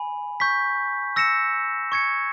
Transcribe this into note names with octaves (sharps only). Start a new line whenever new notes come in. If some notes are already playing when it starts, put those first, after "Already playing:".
Already playing: G#5 B5
C#6 G6 B6
E6 A#6 C#7 E7
C#6 G#6 C#7